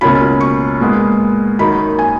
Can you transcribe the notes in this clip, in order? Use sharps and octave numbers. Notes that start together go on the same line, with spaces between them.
C#2 B2 A#3 C#4 F4 B5
C#6
A#2 G#3 B3 F4
F#2 D#3 A#3 D#4 B5
G#5